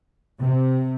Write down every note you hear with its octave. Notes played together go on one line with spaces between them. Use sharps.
C3